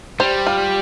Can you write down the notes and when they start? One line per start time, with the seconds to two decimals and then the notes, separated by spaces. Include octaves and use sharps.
0.20 G3 C5
0.47 F4